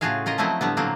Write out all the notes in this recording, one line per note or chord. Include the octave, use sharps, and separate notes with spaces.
A2 C#3 F4 F#4 G#4 F5
C#4 F4 A#4 D#5
F3 F#3 A3 C4 E4 D#5
A2 D3 G3 B3
A#2 D3 F#3 A#3 C4